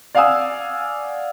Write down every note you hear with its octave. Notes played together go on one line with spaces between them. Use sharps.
D5 F5 F#5 G#5 D#6 E6